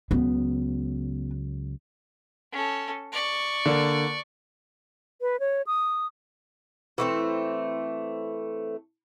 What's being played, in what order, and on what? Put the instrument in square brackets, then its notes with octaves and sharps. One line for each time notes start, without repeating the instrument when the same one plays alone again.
[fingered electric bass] C#2 C#3 F#3 [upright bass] B3
[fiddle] C#4 A4
D5 C#6
[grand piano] D3 A#3
[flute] B4
C#5
D#6
[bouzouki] E3 A3 C4